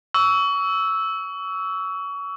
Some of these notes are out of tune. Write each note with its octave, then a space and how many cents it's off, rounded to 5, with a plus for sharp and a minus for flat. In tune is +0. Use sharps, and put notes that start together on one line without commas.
C#6 +30 E6 -5